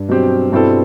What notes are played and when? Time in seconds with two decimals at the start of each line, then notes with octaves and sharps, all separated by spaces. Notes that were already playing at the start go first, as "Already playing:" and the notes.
Already playing: G2
0.09 B2 F#3 C4 G4
0.52 G2 B2 G3 C4 E4 A4